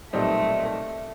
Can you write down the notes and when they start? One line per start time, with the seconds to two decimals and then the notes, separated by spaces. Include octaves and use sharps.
0.13 B1 A#2 G3 A3 C4 D#4